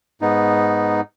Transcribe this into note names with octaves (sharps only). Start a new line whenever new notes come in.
G#2 B3 D#4